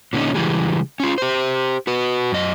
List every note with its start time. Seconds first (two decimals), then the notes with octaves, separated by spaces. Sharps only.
0.13 A#2 D3 B3 C#4 D#4
0.34 C#3 E3 G3 G#3
1.00 C#4 F4
1.18 G4 C5
1.87 F#4 B4
2.32 F#2 D#5